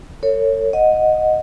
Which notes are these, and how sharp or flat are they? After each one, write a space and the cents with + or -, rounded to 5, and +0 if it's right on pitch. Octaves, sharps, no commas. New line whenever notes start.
A4 +45 C#5 +0
D#5 +0 F#5 -10